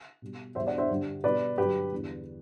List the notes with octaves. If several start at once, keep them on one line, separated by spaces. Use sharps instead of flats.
B2 G3
E2 B2 G3 C5 E5
D5 F#5
C5 E5
G2 D3 G3
B2 G3 B4 D5
G2 D3 F#3 G4 B4
E2 D3 G3